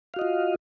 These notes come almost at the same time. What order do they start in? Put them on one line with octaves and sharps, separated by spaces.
F5 F#4 D#5 F4